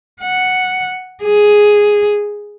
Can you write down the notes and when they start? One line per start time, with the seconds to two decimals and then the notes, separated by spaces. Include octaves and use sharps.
0.22 F#5
1.23 G#4